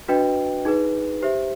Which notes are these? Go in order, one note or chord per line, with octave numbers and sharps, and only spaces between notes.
D4 F#4 B4 D#5 G5
D#4 G#4 B4
G4 C5 E5